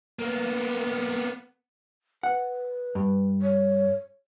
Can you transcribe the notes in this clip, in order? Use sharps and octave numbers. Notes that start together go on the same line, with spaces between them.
A#3 B3
B4 F#5
G2
C#5